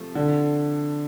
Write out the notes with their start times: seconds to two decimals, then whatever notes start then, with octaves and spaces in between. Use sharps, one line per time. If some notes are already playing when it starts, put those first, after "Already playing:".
Already playing: C3 F3 A3
0.15 D3